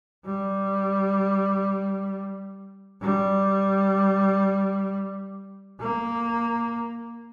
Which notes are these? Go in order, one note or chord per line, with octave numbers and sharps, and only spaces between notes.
G3
G3
A#3